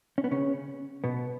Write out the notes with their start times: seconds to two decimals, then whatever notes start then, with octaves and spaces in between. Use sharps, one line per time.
0.18 C#4
0.24 B3
0.31 C#3 C#4
1.04 B2 B3